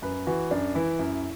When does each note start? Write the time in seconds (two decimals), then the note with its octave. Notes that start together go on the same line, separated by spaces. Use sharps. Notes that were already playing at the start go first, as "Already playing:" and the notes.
0.02 F#2 B4
0.27 E3 F#4
0.51 F#2 D4
0.75 E3 E4
0.99 F#2